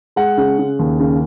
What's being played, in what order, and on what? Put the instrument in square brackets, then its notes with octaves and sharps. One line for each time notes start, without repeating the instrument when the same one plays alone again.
[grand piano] G#3 F#5
C#3
C#3
D#2
C#3